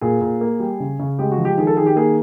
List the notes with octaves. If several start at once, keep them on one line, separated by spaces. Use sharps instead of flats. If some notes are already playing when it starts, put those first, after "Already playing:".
A#2 G#4
A#2
A#3
G3
C#3
C#3
G#3 G4
F#4
F3
G4
D#3 G#4
A4
D#3 G#4
G4
A#3 G#4